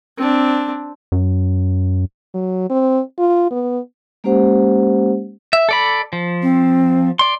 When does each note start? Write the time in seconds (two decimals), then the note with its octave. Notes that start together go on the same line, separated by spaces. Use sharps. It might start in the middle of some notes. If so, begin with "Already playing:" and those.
0.17 C4 D4
1.12 F#2
2.34 F#3
2.70 C4
3.18 F4
3.51 B3
4.24 G#3 A#3 C#4 G4 C5 F#5
5.53 E5
5.69 A4 D5 B5
6.13 F3
6.43 C4
7.19 D5 C6